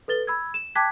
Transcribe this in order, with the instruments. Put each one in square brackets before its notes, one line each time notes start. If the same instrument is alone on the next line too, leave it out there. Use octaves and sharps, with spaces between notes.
[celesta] A4 B4 A6 G7
B5 E6 G#6
E7
G5 A5 D6 F#6 G#6 B6